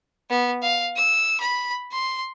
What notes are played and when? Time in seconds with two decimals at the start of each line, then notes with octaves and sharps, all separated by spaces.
0.30 B3
0.62 F5
0.96 E6
1.40 B5
1.92 C6